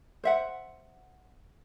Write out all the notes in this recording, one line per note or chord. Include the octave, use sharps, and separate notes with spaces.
C5 E5 F#5